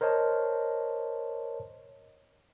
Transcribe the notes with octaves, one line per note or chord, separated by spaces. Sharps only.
A#4 C5 C#5 D#5 A5